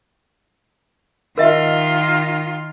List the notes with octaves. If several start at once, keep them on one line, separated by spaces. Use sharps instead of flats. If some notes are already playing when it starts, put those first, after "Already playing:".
D#3 F4 A#4 D#5 E5